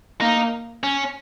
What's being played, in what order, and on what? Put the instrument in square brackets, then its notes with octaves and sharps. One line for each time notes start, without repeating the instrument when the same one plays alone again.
[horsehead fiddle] A#3 [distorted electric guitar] D#4
[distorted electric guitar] C#4